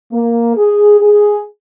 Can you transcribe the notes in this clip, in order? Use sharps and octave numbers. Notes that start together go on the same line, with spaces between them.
A#3
G#4
G#4